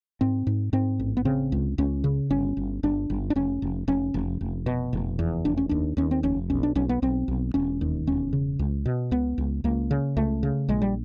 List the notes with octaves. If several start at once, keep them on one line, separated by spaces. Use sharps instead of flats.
G#2 C4
G#2
G#2 C4
A1
B3
C#3 C4
C#2
C#2 C#4
C#3
G1 C#4
G1
G1 D4
G1
D4
F1 C#4
F1
F1 C#4
F1
F1
B2
F1
E2
F1 D4
C#4
D#2 D4
D#2 C#4
C4
F1 C#4
B1 C#4
D4
B1 C#4
B3
B1 C4
B1
E1 C#4
D#2
E1 C#4
C#3
C#2
B2
C#2 B3
C#2
C#2 A#3
C#3
C#2 A3
C#3
A#1 G#3
G3